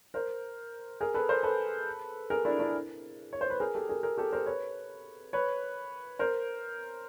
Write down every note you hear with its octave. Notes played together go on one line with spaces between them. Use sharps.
A#4 C5
G#4 A#4
A4 B4
A#4 C5
A4 B4
G#4 A#4
D4 E4
D4 E4
C#5
C5
B4
G#4 A#4
G4 A4
G#4 A#4
G#4 A#4
G4 A4
A#4 C5
B4 C#5
B4 C#5
A#4 C5